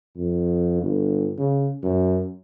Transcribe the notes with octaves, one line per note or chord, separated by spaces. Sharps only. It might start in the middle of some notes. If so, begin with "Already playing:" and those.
F2
G1
C#3
F#2